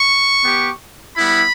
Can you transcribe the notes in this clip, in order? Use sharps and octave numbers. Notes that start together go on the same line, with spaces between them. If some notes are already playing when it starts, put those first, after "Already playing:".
Already playing: C#6
B3 G4
G3 B3 E4 B5